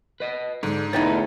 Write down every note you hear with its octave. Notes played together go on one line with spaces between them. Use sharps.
B4 D#5
G#2 D3
E2 D3 A3 B3 D#4 C#5 G5 A6